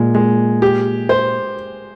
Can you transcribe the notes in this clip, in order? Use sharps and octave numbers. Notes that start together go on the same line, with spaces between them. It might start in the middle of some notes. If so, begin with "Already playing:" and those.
Already playing: A#2 G#3
G#3
G4
C5